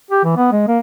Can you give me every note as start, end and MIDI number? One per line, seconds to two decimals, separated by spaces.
0.11 0.22 67
0.24 0.34 52
0.37 0.48 59
0.52 0.65 56
0.68 0.79 58